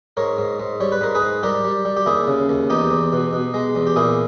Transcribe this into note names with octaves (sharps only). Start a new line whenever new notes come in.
G#2 A#4 C#5
G#2
G#2
G3 C#5
B4
G#2 A#4
G#4 B4
G#2
G3 G4 A#4
G3
G3
G4
D#2 E4 G#4
C#3
D#2
E2 D#4 G4
E2
B2
B2
G#3
E2
G4
A#2 E4 G#4